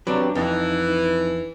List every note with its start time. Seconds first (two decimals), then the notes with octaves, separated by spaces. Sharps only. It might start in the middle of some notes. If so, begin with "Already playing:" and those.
0.07 F#3 C4 D4 G4 B4
0.35 F2 E3 D#4